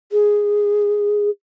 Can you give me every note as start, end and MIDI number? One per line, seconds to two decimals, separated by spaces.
0.12 1.30 68